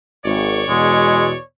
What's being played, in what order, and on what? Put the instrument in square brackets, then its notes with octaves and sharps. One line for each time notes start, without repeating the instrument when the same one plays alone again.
[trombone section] G#1 [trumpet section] C#5 D5 C#6
[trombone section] E2 B2 [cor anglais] G#3